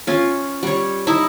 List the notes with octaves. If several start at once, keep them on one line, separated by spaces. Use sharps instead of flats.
C#4 F4
G3 C#5
D#4 E4